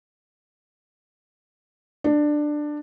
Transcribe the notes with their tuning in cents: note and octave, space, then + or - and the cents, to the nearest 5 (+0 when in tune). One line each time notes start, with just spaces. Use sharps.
D4 +15